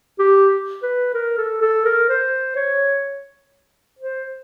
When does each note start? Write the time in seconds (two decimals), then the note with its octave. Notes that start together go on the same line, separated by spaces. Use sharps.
0.19 G4
0.83 B4
1.14 A#4
1.38 A4
1.61 A4
1.85 A#4
2.09 C5
2.56 C#5
3.99 C5